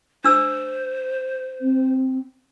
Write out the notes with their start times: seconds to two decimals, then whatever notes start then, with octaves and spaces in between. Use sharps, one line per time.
0.24 D4 C5 E6
1.61 C4